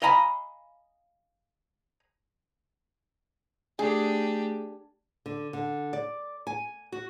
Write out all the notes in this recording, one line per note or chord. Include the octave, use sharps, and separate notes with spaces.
D#5 F5 G#5 A#5 B5
A3 D4 G4 G#4
D3
D3
D5
G#5
F#4